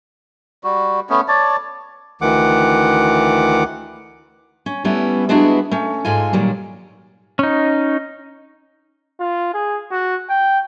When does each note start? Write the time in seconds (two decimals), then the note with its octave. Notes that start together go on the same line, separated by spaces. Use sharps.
0.64 G3 F#4
1.10 A3 B3 C#4
1.28 C#5 D5 A5
2.21 D2 D#3 E3 F#5 D6
4.66 C#4
4.84 G3 A3 B3 C#4 E4
5.29 G#3 B3 D4 E4 F#4 G#4
5.71 A3 C#4
6.05 G#2 G#3 F4 A4 F5 G#5
6.33 A#2 D#3 F#3 G3
7.39 C#4 D#4
9.20 F4
9.54 G#4
9.91 F#4
10.29 G5